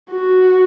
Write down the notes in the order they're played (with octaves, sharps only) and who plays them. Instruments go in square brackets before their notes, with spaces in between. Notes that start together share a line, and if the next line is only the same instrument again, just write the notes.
[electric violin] F#4